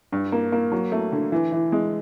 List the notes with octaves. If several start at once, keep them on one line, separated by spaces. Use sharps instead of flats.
G2
A#3
A#3
F#3
A3
D3
E3
E3
G#3